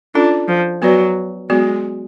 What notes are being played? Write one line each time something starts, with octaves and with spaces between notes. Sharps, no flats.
C#4 D4 F4 A4
F3
F#3 B3 F#4 B4 D5
F#3 G#3 B3 F#4